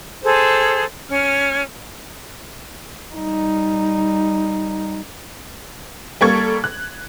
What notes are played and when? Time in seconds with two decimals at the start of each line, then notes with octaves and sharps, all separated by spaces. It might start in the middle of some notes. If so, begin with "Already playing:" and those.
0.24 G#4 A4 C5
1.09 C#4 F6
3.14 G3 D#4
6.21 G3 A#3 A4 C#6 G#6
6.64 F#6